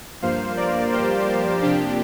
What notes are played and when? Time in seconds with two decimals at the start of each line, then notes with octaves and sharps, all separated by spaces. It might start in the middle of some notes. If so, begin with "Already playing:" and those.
0.22 G2 F3 A#3 C5 F5
0.57 A#4 D5
0.92 G4 C5
1.62 F2 C3 F3 A#3 D4 G4